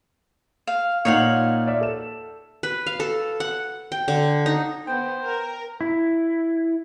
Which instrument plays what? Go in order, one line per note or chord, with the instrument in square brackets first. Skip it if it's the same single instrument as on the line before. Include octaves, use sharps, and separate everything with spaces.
[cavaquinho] F5
[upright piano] A#2 D#4 [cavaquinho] C#5 F5 F#5
[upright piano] D5 E5
A4 E7
[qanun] B4
F5
A4
F#5
G5
D3
D#4
[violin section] B3 [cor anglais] C5 [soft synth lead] G5
[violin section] A#4
[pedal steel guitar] E4